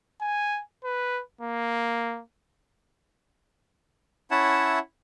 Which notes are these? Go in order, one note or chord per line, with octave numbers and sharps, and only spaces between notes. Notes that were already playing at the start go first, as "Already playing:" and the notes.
G#5
B4
A#3
C#4 E4 C#5 E5 F#5 A5